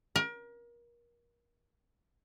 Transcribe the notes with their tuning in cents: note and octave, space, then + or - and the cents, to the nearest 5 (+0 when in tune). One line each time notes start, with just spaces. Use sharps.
A#4 +30